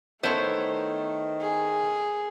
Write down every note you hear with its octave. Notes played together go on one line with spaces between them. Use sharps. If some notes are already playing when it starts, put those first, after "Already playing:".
D#3 A3 B3 E4 A4 C5 C#5
G#4